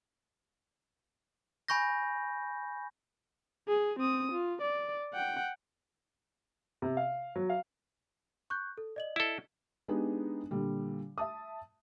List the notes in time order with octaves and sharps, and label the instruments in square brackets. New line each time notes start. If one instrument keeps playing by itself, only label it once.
[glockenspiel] G#5 B5 C#6 G6 A#6
[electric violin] G#4
C4 D#6
F4
D5
F#5 G5
[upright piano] C3
F5
F#3
F5
[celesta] C#6 F#6 G6
A4
D5 D#5 F#7
[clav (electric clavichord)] E4 A4
[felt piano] G#3 B3 D4 D#4 G4 G#4
A#2 D3 G3
E5 A5 D#6